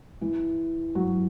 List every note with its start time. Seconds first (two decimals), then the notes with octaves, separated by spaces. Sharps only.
0.21 E3
0.95 F#3